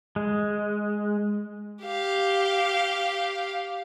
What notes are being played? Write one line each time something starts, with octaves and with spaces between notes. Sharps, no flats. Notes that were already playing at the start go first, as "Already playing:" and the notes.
G#3
G4 F5